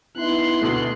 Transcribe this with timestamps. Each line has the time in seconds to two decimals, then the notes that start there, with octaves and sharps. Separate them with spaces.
0.17 B3 D#4 E4 C6 F#6
0.62 D2 B2 A3